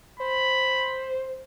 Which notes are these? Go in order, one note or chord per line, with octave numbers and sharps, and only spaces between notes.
C5 B5